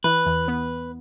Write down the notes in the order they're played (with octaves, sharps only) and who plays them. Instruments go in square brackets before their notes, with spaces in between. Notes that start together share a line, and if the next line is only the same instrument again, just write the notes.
[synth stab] E3 [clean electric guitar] B4
[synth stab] E2
B3